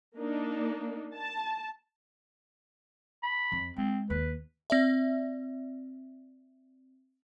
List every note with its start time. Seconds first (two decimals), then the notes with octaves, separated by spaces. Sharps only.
0.18 A#3 D4 D#4
1.15 A5
3.23 B5
3.52 F2
3.76 G#3 C4
4.10 D#2 B4
4.70 C4 D5 E5